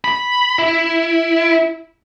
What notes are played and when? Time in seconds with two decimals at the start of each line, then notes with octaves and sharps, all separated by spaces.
0.04 B5
0.59 E4